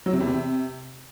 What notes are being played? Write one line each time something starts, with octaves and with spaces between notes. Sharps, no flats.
F#3
C3
E2
C3